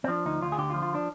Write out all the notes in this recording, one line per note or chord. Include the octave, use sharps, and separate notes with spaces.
C4
F3 D4
D2 D#4
D2 F4
G#4
D3 G4
F4
F3
F4
D4